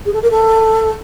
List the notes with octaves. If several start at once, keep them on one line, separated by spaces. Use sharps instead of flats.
G#4
A4
A#4
A4